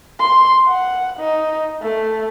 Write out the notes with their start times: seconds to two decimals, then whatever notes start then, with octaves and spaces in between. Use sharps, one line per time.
0.20 C6
0.68 F#5
1.20 D#4
1.82 A3